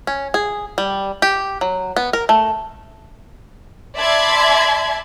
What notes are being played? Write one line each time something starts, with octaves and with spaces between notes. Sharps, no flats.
C#4
G#4
G3
G4
F#3
B3
A#4
A3
D5 E5 A5 B5 C6 G#6